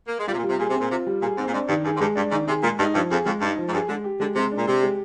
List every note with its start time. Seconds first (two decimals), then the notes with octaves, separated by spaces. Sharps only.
0.08 A#3
0.18 G#3
0.27 G3 F4
0.33 C3
0.38 A#2
0.43 G3
0.49 C3
0.59 A#2 G#4
0.70 C3
0.75 C4
0.80 A#2
0.90 C3 F4
1.06 G3
1.22 A#2 G#4
1.38 G#2 C4
1.47 A#2
1.53 G#2 D4
1.69 G2 D#3
1.85 G2 G#4
1.96 G#2
2.00 G2 G#3
2.16 G2 D4
2.31 G#2 D#3
2.47 C3 G#4
2.63 A#2 G#3
2.79 G2 D#4
2.94 G2 F3
3.10 F2 G#4
3.26 F2 G#3
3.41 G2 D#4
3.57 F3
3.68 G#2
3.73 G2 G#4
3.89 D3 G#3
4.04 G4
4.20 D3 G#3
4.35 C3 G#3
4.52 D4
4.57 A#2
4.67 C3 G4
4.83 G#3